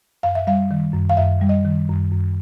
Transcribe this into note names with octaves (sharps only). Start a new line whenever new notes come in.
F#2 F5
E5
G3 F5
D#3
F#2
F5
F#2 E5
G3
D#5
D#3
F#2
F#2